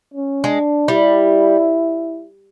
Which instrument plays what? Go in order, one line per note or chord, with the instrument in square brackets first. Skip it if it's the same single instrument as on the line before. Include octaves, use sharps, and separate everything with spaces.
[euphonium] C#4
[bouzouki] G#3 [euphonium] D4
[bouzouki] G3 [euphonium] E4